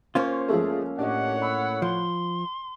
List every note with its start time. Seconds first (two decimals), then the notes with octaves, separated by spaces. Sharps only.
0.15 A#3 C#4 F4 C5 C#6
0.49 F3 G#3 A3 G#4
0.99 A2 D4 G4 C#5 D#5 F#5
1.42 B5 E6
1.82 F3 C6